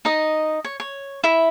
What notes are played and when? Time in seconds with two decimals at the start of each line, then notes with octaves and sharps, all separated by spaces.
0.05 D#4 D#5
0.64 C#5
0.80 C#5
1.24 E4 E5